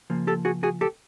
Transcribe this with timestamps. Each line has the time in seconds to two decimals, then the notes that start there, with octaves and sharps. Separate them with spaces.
0.10 C#3 F3 A#3
0.27 G4 A4
0.45 F#4 G#4
0.63 F#4 G#4
0.81 G4 A4